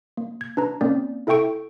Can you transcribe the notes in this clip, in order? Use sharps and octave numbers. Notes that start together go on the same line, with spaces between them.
A#3
G#6
D4 B4 A#5
A#3 C4 C#4 A#4 D5
E4 A4 E5 G5 C#6 D7